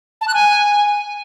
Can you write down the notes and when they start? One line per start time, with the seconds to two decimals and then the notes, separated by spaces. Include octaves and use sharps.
0.21 A5
0.28 F#6
0.34 G#5